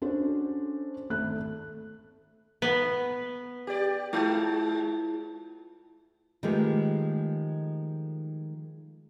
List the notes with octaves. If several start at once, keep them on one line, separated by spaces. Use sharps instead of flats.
C#4 D4 F#4 A4 C5
G#1 A3 F#6
B3
G4 D5
G#3 E4 F4 A5
D#3 F3 G#3 A3 G4 B4